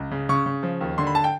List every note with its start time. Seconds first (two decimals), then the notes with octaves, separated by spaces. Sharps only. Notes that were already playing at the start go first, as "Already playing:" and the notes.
Already playing: C#2
0.11 C#3
0.29 C#3 C#6
0.46 C#3
0.63 F3
0.81 D#2
0.98 D3 C6
1.07 B5
1.15 A5
1.24 G5